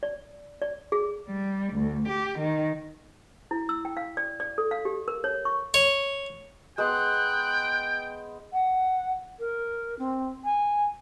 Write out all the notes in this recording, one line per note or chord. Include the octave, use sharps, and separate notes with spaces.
D5
D5
G#4
G3
D2
G4
D#3
E4
E6
G5
F5
D5
D5
A4
F5
G4
A#4
C#5
C#6
C#5
G#3 B3 G5 F#6
F#5
A#4
C4
G#5